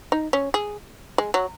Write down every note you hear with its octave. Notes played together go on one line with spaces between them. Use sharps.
D#4
C#4
G#4
G#3
F#3